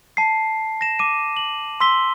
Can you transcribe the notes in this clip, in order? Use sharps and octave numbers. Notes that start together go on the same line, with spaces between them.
A5 C7
A#6 E7
D6 D#7
F#7
C6 E6 B6 G7